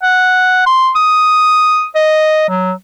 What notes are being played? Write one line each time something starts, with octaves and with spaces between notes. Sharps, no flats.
F#5
C6
D#6
D#5
F#3